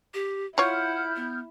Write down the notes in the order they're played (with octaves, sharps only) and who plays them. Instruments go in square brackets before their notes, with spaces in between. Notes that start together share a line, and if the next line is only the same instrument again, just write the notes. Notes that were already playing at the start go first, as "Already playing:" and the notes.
[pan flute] G4
[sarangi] E4 [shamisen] F4 C#5 [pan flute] F#5 [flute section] F6 G6
[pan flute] B3